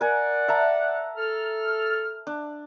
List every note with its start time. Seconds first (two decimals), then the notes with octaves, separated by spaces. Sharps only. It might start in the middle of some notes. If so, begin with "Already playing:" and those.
0.01 A#4 D5 F#5 G#5
0.48 E5 A5 A#5
1.16 A4 F6
2.27 D4